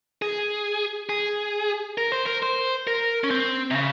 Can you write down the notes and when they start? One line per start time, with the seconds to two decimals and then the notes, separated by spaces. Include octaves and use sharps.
0.22 G#4
1.09 G#4
1.98 A#4
2.12 C5
2.25 A#4
2.43 C5
2.87 A#4
3.24 C#4
3.31 C4
3.71 C3
3.75 C#3